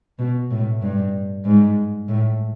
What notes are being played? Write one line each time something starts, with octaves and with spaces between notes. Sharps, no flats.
B2
A2
G2
G#2
A2